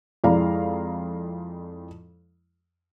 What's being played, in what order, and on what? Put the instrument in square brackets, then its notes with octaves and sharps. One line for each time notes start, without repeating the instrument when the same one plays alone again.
[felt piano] F2 G#3 E4 D5 F5 A#5